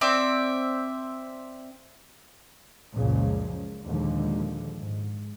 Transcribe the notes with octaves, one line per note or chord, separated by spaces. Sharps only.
C4 D5 E5
C#2 F#2 A#2 C#3 F3
D#2 A#2 D3 F3 G#3
G#2